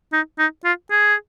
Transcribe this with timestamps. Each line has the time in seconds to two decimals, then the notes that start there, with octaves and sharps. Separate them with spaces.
0.13 D#4
0.39 D#4
0.64 F4
0.91 G#4